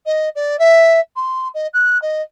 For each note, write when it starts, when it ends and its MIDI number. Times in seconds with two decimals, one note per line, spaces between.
0.06 0.29 75
0.35 0.57 74
0.59 1.00 76
1.16 1.49 84
1.54 1.67 75
1.74 2.00 90
2.02 2.22 75